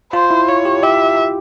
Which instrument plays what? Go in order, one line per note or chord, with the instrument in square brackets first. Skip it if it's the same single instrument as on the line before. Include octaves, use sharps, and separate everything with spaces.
[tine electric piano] F4 [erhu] C5
[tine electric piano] E4
[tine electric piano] F4 [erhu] C#5
[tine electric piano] G4
[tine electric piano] G4 [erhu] E5